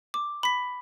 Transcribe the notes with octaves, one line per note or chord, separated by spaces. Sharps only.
D6
B5 B6